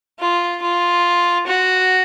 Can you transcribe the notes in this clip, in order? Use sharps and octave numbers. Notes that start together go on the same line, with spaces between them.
F4
F4
F#4